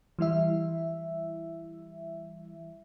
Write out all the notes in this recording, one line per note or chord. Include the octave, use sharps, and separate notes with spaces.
E3 G3 E4 E5